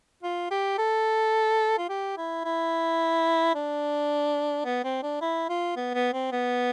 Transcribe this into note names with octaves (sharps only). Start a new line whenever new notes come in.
F4
G4
A4
F4
G4
E4
E4
D4
B3
C4
D4
E4
F4
B3
B3
C4
B3